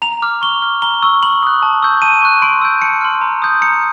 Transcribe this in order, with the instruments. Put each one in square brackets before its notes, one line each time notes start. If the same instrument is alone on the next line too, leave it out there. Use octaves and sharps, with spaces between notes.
[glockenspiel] A#5 F7
D6 F6
C#6 G7
F6
A#5 G7
C#6 E6
B5 F#7
D#6 F#6
A5
C#6 E6 G6
A5 D#7
C#6 F#6
C6 D7
E6 G6
A5 C#7
C6 F6
A#5
D#6 G6
A#5 C#7